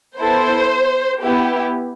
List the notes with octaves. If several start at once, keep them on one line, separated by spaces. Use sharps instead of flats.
B3 E4 A4 C5
B3 E4 G4